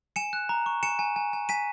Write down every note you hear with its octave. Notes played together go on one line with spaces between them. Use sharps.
G#5 C#7 E7
F#6
A#5
C#6
G#5 C#7 E7
G#5
G#5
G#5
G#5 B6 D#7